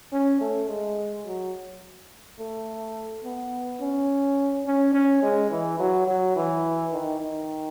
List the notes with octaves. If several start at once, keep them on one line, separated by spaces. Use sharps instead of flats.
C#4
A3
G#3
F#3
A3
B3
C#4
C#4
C#4
G#3
E3
F#3
F#3
E3
D#3
D#3